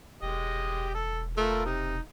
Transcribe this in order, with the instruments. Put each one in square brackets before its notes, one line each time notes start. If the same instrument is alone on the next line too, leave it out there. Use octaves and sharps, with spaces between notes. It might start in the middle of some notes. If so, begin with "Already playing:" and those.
[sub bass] E1 [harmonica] G#3 G4 D#5
[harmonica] A4
[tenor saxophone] A3 [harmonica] F4 A4 A#4
[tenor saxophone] C3 [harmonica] D#4